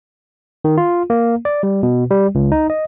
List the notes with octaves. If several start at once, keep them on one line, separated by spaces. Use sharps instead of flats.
D#3
F4
A#3
D5
G3
B2
G3
C#2
D#4
D#5